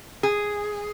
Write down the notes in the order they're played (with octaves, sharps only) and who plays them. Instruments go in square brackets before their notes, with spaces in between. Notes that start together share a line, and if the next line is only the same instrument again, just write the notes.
[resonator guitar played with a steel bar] G#4